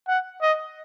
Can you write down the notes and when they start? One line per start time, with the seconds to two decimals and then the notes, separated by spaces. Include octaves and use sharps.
0.08 F#5
0.42 D#5